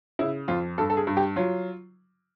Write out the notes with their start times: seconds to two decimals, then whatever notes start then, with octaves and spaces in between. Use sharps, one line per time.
0.19 C#3 E4
0.48 F2 F4
0.78 G2 A4
0.90 A4
0.97 G#4
1.07 G2
1.17 G4
1.36 F#3 F4